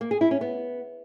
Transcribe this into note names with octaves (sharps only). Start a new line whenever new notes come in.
A#3
G#4
E4
C#4
B3